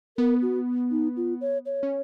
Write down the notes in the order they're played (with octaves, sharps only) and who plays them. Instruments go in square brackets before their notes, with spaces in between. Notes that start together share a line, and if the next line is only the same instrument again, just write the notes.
[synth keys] B3 [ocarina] A#4
[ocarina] F#4
D#4
F4
C#5
C#5
[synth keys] C#4